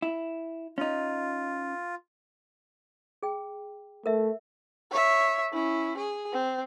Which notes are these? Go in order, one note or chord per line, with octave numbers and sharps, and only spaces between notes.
E4
C#4 D#4 F4
G#4 G5
A3 A#4 E5
C#5 E5
C#4 E4
G#4
C4